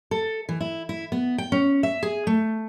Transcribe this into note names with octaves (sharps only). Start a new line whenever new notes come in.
A4
E3
E4
E4
B3
G5
C#4
E5
G#4
A3